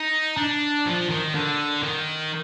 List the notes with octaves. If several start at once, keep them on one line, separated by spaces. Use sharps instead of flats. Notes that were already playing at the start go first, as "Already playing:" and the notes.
Already playing: D#4
D4
F3
D#3
D3
D#3